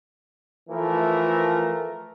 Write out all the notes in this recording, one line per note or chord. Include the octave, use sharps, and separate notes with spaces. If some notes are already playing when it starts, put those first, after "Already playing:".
E3 F3 A3 A#4